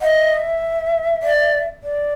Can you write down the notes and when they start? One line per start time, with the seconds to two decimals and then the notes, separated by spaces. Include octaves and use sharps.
0.01 D#5 F#5
0.05 E5
1.23 D5
1.83 D5